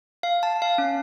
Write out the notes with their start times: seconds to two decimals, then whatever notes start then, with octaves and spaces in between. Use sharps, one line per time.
0.23 F5
0.43 A5
0.62 F5
0.78 C#4